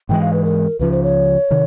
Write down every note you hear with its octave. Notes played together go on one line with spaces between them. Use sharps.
G#2 E3 G#3 G5
F5
B4
A#4
C#2 C#3 F3 B4
C5
C#5
C3 D#3